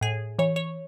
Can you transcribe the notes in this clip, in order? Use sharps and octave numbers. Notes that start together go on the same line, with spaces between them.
A2 G#4
E3 C#5
C#5